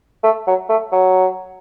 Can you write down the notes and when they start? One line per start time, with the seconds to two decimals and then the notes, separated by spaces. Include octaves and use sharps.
0.24 A3
0.47 F#3
0.69 A3
0.92 F#3